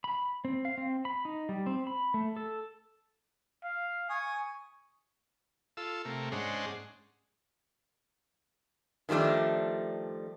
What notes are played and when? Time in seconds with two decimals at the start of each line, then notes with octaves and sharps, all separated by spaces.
0.04 B5
0.45 C4
0.65 F5
0.78 C4
1.05 B5
1.25 D#4
1.49 G3
1.66 C4
1.87 B5
2.14 A3
2.36 A4
3.64 F5
4.09 G#5 C#6 D#6
5.77 F4 A4 E6
6.05 C3 A3 A#3
6.32 G#2 G#3 C#4 D4 C5 F#5
9.09 D#3 F3 G3 A3 D4